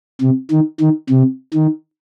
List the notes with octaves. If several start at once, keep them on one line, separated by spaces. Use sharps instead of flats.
C3
D#3
D#3
C3
D#3